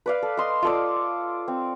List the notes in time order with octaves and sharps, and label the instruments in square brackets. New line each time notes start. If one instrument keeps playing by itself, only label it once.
[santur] B4 D5 F5
A4
D#5 C6
F4 A4 D5
C4